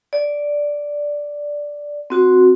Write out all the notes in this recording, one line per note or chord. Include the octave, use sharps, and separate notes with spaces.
D5
C4 F#4